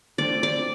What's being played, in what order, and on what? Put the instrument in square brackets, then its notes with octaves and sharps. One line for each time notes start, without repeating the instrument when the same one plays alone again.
[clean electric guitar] D3 A3 C4 [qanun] D5
[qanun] D5